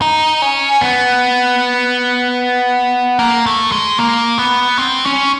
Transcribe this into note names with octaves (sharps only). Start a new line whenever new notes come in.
D#4
C#4
B3
A#3
A3
G#3
A#3
B3
C4
C#4